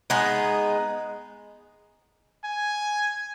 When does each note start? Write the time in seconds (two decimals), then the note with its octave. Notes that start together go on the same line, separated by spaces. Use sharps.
0.10 G#3 B3 D#4
2.44 G#5